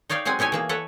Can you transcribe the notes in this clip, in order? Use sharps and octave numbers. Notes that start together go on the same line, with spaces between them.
D#4 C#5 D5 F5 G5
F#3 G#3 C4 F#5 G#5
B2 D#4 E4 C#5 G#5
E3 A#3 G#4
A4 B4 C#5 F#5